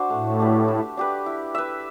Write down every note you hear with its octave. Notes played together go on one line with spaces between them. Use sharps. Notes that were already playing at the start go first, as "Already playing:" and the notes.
Already playing: D4 F#4 C5
A2 A3
D4 G4 B4
A3
D4 G4 B4
E4
B4 E5